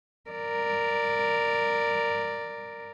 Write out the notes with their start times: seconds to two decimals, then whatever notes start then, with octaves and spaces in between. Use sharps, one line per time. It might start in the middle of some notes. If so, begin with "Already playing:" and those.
0.30 A#4 D5